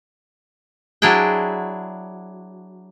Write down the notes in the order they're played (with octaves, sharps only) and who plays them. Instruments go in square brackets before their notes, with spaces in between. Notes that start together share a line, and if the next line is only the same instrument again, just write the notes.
[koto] F#3 D4 E4 G#4 G5